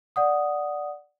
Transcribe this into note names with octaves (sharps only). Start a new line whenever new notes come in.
D5 F#5 D#6